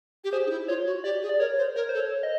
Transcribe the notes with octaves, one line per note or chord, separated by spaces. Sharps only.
G4
G#4 C5
D#4
E4
F4 C#5
F#4
G4 D5
G#4
D5
A#4 C#5
C5
A#4 C#5
A4 C5
C#5
D#5